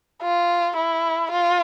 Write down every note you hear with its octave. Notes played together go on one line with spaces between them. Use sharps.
F4
E4
F4